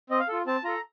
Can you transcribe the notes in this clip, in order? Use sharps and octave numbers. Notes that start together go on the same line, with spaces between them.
C4 D#5
F5
F4 A4
C4 A5
F4 A4 A#5